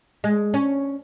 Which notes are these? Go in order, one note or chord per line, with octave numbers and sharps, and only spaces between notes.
G#3
C#4